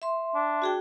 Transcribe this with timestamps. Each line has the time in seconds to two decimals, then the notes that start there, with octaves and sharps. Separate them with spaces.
0.02 E5 C6
0.35 D4
0.62 F#4 G#4 G5